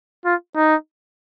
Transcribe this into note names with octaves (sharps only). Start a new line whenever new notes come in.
F4
D#4